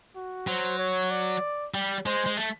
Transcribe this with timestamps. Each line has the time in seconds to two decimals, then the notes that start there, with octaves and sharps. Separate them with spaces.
0.15 F#4
0.47 F#3 C5
0.79 C#5
1.11 D5
1.74 G3
2.06 G#3 C5
2.26 G#3
2.37 A3